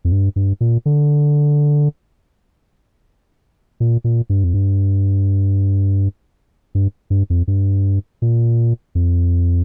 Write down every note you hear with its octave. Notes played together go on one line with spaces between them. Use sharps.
F2
G2
G2
A#2
D3
A#2
A#2
G2
F2
G2
G2
G2
F2
G2
A#2
F2